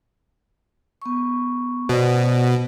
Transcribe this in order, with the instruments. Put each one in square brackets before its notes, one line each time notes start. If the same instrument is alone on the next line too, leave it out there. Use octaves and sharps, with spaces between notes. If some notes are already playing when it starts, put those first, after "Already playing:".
[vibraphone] B3 C#6
[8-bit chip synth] B2 [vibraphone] C5 D5